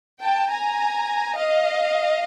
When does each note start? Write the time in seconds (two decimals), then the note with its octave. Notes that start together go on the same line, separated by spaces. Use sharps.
0.22 G5 A5
0.51 G#5 A#5
1.37 D#5 F5